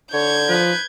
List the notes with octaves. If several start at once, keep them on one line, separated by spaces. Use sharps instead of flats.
D3 C#5 G6 G#6
F3 B4